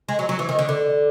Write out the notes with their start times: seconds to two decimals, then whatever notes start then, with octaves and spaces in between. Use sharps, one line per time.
0.09 G#3
0.19 F#3
0.29 F#3
0.39 E3
0.49 D#3
0.59 D3
0.69 D3